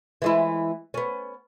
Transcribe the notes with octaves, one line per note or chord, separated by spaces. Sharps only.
E3 G#3 E4
B3 C#4